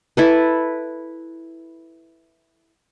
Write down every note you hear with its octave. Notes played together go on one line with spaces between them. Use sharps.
E4 A4 B4